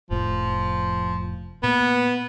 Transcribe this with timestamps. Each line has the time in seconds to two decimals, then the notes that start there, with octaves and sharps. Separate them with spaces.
0.11 F1 A2 F3
1.63 A#2 B3